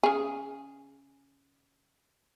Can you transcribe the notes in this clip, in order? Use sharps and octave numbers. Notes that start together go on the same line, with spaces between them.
C#3 G#4